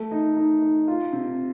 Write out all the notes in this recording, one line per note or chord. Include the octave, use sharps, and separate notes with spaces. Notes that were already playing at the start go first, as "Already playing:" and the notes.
Already playing: A3
D#4
D#4
D#4
F4
C3